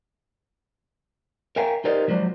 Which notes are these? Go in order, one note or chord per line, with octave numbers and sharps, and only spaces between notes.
A#4 E5 F5 G5 G#5 A#5
D#4 G4 A#4 C5 D5 D#5
F3 F#3 G#3 C5 D5